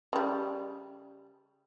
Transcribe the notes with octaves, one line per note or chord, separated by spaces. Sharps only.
C#3 G3